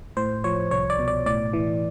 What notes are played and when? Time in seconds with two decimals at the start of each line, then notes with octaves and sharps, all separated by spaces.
0.17 A2 C5
0.44 F3 C#5
0.71 C2 C#5
0.90 D5
0.99 B2
1.08 D5
1.26 A2 D5
1.53 E3